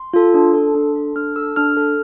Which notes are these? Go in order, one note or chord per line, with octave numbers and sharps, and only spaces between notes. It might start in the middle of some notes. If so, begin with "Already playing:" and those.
Already playing: C6
F4 A4
D4
A4
D4
A4
D4 F6
A4 E6
D4 F6
A4